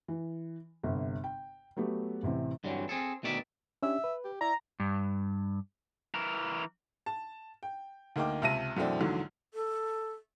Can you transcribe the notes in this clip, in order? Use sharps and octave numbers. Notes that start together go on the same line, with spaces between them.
E3
G1 C3
G5
F#3 A3 B3 G4
A1 C3 E3 C4
G2 D3 E3 F#3 C4
C4 G#4 A4
D2 B2 D#3 D5 E5
C#4 D4 G4 E5
B4
G4
E4 D5 A#5
G2
E3 A#4
A5
G5
D2 A#3 D#4 G5 D6
C#2 C3 E5 A5 A#6 D#7
F#2 B2 E3 A3 C4 D4
A#1 E2 G#2 D3 F#3
A4